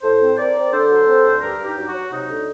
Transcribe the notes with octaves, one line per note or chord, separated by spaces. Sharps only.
A2 A4 C5
C4
C4 A#4 D5
C4
D3 A4 C5
F#3
C4
D2
G2 G4 A#4
G2
D#4 G4
F#3
F#4
F#3
C3 D#4
D2